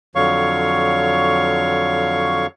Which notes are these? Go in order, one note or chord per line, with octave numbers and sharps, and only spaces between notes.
F2 D3 F#3 C#5 F5 C#6